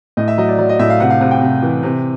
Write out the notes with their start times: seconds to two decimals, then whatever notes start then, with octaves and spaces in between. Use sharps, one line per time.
0.17 A2 D#5
0.28 E5
0.38 F#3 D#5
0.48 D5
0.59 F#3 D5
0.69 D#5
0.79 A2 E5
0.90 F5
1.00 C3 F#5
1.10 F5
1.21 C3 F#5
1.31 G5
1.41 C3
1.63 E3
1.83 C3